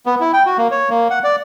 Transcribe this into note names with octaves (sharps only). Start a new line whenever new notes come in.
B3
E4
G5
F#4
A#3
C#5
A#3
F#5
D5